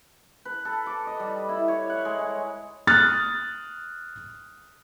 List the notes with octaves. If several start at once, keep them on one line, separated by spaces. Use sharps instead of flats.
B4
A4
D6
D#5
G3
E4
C#5
F#5
G#3
C#5
D#6 F6 F#6 A6